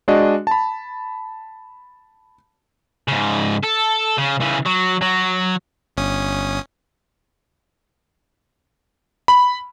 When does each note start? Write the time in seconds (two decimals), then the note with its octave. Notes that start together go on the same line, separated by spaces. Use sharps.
0.08 G#3 D4 F#4 D5 D#5
0.47 A5 B5
3.08 G#2 C#3
3.64 A4
4.18 C#3
4.41 C#3 E3
4.66 F#3
5.01 F#3
5.97 G1 C#4 D#6
9.28 B5